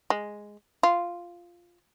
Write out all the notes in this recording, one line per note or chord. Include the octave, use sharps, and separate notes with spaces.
G#3
F4